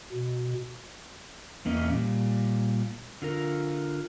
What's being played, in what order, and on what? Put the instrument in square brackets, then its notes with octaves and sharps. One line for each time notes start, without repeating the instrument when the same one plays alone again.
[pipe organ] B2
[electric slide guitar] E2 A#3 C#4 D#5
A#2 G3
D3 F4 A#4